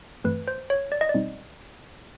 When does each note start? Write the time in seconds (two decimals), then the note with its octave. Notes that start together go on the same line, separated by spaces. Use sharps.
0.24 G2 E3 A3 C4 B4
0.48 C5
0.70 C#5
0.92 D5
1.01 D#5
1.09 D5
1.14 B2 G3 C4 D#4